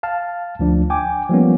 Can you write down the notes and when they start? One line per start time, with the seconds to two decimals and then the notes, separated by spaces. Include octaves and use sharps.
0.03 F5 A5 F6
0.59 D2 F3 D4
0.90 G5 G#5 D6
1.30 F3 G3 A#3 B3 C#4